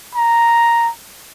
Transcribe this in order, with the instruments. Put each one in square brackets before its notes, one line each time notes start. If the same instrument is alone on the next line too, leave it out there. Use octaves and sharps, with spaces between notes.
[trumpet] A#5